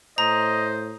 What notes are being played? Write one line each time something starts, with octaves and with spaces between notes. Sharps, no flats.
A2 C5 D#5 A#5